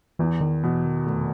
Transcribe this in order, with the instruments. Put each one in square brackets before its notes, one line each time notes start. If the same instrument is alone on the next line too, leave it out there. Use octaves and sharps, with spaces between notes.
[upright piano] E2 [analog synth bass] E3
[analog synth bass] D#3
[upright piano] B2 [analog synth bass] E3
[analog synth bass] D#3
[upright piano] F1